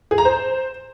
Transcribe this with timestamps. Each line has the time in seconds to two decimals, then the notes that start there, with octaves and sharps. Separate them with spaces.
0.11 G#4
0.18 A#5
0.25 C5